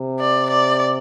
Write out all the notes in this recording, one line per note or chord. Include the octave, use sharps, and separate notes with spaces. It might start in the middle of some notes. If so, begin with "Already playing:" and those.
Already playing: C3
D5
D5